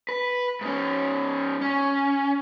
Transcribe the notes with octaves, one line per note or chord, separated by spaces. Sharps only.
B4
G#2 C#4
C#4